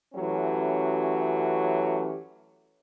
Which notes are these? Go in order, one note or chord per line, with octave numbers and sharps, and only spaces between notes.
F#2 E3 F#3 A3 C#4 G4